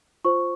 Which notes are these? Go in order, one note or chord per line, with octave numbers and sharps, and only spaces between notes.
F4 C5 C#6